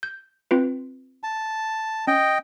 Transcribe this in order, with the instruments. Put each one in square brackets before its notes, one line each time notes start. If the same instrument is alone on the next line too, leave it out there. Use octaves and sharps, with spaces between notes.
[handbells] G6
C4 F4 B4
[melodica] A5
[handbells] C#4 [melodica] D#5 G5